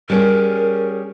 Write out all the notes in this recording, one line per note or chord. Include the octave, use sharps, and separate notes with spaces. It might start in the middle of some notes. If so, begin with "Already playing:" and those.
G3 C#4 G#4 A#4